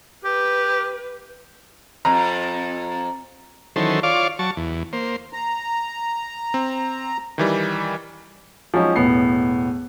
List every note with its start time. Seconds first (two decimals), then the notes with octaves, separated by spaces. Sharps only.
0.24 G4 B4
2.05 F2 A#5
3.76 D#3 E3 F#3 C#4 A4 C5
4.03 F4 C#5 D5 F5 D6
4.39 F#3 A5 C#6
4.57 E2
4.93 A#3 C5
5.33 A#5
6.54 C4
7.38 D#3 E3 G3
8.74 F3 F#3 G#3 C#4 D#4
8.96 E1 A2 B3 C7